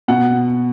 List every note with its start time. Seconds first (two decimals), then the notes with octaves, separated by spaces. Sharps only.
0.08 B2 F#5